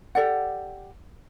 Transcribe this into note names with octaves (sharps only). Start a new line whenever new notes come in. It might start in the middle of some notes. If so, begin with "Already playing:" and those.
G4 A4 D5 F#5